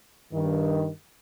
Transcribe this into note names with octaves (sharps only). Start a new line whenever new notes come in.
G2 D#3